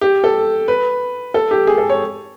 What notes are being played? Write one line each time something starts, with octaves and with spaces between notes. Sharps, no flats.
G4
A4
B4
A4
G4
G#4
A4
C#5